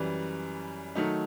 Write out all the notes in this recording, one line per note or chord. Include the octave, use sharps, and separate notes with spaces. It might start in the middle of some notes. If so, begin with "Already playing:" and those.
Already playing: F#2 E3 G3
D#3 F#3 A3 D#4